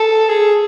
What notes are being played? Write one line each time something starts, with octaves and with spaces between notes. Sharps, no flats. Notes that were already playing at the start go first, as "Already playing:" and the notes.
Already playing: A4
G#4